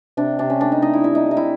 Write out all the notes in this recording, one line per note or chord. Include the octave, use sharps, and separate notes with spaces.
C3 D4
C3 D4
C#4
A3 D4
D#4
A3 D#4
E4
G3 E4
D#4
G3 D#4
E4